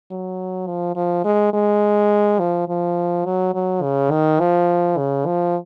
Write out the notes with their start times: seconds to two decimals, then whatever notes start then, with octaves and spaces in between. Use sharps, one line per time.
0.11 F#3
0.67 F3
0.96 F3
1.25 G#3
1.54 G#3
2.39 F3
2.68 F3
3.26 F#3
3.54 F#3
3.83 C#3
4.11 D#3
4.40 F3
4.98 C#3
5.26 F3